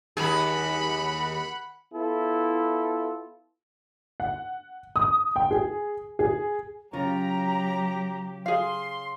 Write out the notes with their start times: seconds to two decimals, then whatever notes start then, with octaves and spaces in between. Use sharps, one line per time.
0.17 D#2 G#4 F#5 B5
1.94 B3 E4 F4 A4
4.20 F#5
4.96 D#6
5.36 G5
5.51 G#4
6.19 G#4
6.93 C#3 F#3 F4 G4 C#5 A#5
8.46 G#4 F5 C6